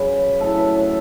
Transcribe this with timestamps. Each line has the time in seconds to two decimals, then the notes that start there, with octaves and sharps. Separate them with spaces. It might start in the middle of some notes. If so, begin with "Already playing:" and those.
Already playing: F#2 C#3 F#3 B4
0.40 A2 F#3 A4
0.58 B4
0.75 A4